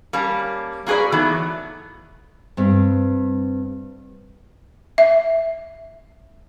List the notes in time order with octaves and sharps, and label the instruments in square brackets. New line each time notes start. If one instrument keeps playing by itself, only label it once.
[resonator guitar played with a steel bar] G3 A#3 C#4 A5
A#3 F#4 G#4 B4 D5
E3 F#3 A3 B3 D#4
[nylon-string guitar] G2 C4
[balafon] E5